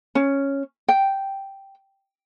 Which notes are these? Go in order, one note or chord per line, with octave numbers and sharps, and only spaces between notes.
C#4
G5